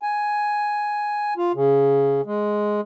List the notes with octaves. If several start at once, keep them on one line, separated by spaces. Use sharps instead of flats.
G#5
F4
C#3
G#3